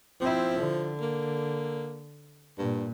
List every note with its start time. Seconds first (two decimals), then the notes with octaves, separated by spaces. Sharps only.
0.21 F3 C4 E4
0.59 D3
1.02 A#3
2.59 G2 A#2